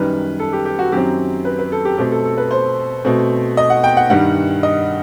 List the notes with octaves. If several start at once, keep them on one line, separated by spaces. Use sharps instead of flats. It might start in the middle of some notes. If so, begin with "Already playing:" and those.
Already playing: F#2 D#3 G3 B4
A4
G4
G4
F#4
F#2 D#3 F#3 C4 G4
B4
B4
A4
G4
B2 A3 C4 G4
A4
A4
B4
C5
B2 A3 C4
D#5
F#5
G5
F#5
G2 D#3 G3 F#5
D#5